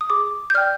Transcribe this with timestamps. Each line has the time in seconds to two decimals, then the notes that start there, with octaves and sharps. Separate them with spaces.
0.01 D#6
0.10 G#4 D6
0.50 G6
0.55 D5 G5 F6